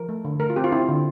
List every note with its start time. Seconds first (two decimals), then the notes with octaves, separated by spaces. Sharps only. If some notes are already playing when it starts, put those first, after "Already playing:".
Already playing: F3 A#4
0.09 A3
0.25 D3
0.40 A3 A#4
0.50 F4
0.56 C4 G4
0.64 F4
0.72 C4 E4
0.88 D3